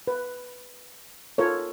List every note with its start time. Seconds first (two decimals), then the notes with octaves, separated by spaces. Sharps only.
0.07 B4
1.38 F4 A4 A#4 C#5